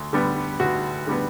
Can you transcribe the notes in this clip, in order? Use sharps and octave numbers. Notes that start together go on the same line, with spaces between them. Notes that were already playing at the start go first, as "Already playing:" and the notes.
Already playing: D2
D3 G3 B3
D2 F#4
D3 G3 B3